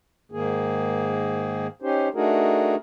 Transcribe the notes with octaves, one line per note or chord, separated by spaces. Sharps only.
G#2 D#3 A#3 G#4
C#4 D#4 G4 C5
A3 D4 D#4 F#4 G#4 A#4